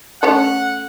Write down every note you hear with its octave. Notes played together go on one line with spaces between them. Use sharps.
A3 C#4 A4 F#5